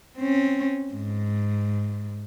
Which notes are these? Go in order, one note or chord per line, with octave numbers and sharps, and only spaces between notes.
C4 C#4
G#2